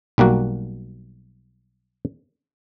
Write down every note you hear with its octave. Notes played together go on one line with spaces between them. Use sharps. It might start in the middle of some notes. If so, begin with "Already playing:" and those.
B1 G3 A#3 F#4